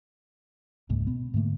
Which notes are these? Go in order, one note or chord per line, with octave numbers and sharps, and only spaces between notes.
E1 C#2 G#2 A#3
B2 B3
G#2 D3 A3 A#3